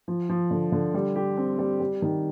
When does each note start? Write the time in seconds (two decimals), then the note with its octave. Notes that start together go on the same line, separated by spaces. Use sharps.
0.08 F3
0.29 F3
0.51 D3
0.72 D3
0.94 G3
1.16 G4
1.38 C4
1.58 G3
1.80 G3
2.02 D#3